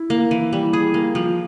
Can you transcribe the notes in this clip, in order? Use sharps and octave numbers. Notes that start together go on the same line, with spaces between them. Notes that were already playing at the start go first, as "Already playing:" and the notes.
Already playing: E4
A#3
E3
G3
G#4
A#3
F3